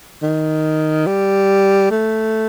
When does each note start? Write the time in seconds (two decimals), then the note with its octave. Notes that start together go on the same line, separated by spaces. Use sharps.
0.22 D#3
1.07 G3
1.91 A3